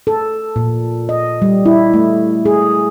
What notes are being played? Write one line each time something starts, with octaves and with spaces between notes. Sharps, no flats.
A4
A#2
D#5
G3
E4
A3
G#4